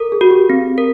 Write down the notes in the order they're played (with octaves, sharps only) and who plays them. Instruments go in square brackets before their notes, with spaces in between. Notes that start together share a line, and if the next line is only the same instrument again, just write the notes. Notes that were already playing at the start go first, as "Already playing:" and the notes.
Already playing: [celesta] A4 [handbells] A#4
[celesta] G#4
[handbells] F#4
[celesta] G4
[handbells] C4
A#4